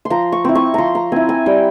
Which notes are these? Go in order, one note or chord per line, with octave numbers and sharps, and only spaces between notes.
C6
F3 A#5
C#6
C4 E4
C#6
F3 A#5 C6
A#5
C4 E4 G#5
G#5
G3 G5